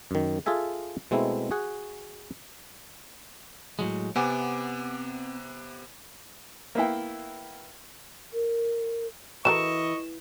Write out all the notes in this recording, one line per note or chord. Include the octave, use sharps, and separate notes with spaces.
F#2 D#3
F4 G#4 A4 E5 G#5
B2 G#3 A3 C4 E4
F#4 G#4 F#5
A2 F#3 G#3
C3 B3 C4 F#5 G#5 D6
A#3 B3 E4 G5
A#4
E3 F#4 A4 A#4 D#5 C#6 E7